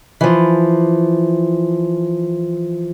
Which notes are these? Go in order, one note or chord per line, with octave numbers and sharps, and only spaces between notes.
E3 F3